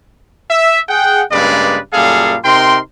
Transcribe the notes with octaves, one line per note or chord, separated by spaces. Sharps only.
E5
G#4 F#5 G5
G2 C#3 G#3 A#3 B4 D5
F#2 A#2 G3 G#4 A4 F5
C3 D#4 A#4 G5 C6